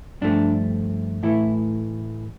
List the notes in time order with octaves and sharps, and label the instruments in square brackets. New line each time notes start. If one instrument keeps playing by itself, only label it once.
[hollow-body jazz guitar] G2 F3 A3 D4
A2 E3 A3 E4